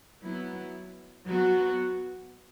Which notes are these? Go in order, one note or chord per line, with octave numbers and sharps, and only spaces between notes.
F#3 B3 E4
F#3 B3 F#4